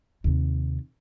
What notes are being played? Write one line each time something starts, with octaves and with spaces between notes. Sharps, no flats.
D#2 C3